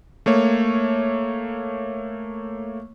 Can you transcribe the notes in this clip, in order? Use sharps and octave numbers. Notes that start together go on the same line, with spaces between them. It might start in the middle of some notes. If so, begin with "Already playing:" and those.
A3 A#3 C#5